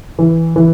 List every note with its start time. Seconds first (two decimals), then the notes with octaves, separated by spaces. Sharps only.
0.19 E3
0.56 E3